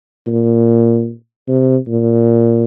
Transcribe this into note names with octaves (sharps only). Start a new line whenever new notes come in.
A#2
C3
A#2